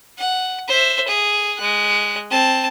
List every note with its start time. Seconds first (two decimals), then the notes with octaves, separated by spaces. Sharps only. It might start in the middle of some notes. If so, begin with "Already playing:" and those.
0.18 F#5
0.68 C5 E5
1.07 G#4
1.58 G#3 F#6
2.31 C4 A5